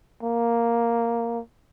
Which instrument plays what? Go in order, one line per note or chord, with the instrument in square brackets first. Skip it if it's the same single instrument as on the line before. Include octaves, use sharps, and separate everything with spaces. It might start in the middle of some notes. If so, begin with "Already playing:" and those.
[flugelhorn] A#3